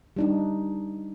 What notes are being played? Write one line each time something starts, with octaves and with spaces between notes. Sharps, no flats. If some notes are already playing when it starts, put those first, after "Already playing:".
G3 D4 D#4